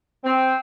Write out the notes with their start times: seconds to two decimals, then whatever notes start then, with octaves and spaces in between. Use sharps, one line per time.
0.24 C4